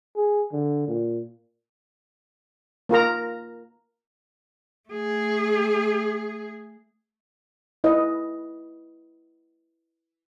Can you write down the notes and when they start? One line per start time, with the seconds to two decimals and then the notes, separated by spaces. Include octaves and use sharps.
0.16 G#4
0.52 D3
0.88 A#2
2.89 A#3 F4 A#4 A#5
4.89 A3 G#4
7.84 E4 B4 D#5